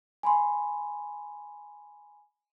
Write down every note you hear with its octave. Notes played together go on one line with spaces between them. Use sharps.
G#5 B5 C6